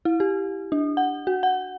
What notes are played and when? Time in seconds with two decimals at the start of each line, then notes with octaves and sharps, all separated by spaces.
0.05 E4
0.20 G4
0.72 D4
0.97 F#5
1.27 F#4
1.43 F#5